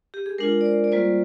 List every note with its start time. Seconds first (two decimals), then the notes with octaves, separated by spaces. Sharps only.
0.14 G4
0.26 G#4
0.38 G#3 D4 F4 A#4
0.61 D5
0.65 C5
0.84 D5
0.92 G3 A#3 F4 C5